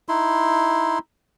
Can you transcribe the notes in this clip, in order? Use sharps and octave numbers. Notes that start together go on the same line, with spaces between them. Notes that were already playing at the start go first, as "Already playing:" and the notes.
D#4 E4 C6